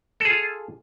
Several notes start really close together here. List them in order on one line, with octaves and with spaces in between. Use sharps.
A4 G#4 F4